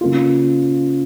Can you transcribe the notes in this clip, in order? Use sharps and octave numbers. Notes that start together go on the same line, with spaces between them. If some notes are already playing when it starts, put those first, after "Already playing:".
C#3 A#3 F4